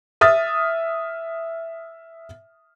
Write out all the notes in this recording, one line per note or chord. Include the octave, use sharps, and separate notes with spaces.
E5 D#6 F6 A6